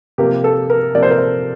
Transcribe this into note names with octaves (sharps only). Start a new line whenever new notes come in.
C3 F3 A#3 G4
A4
A#4
C3 F3 A#3 D5
C5
A#4
C5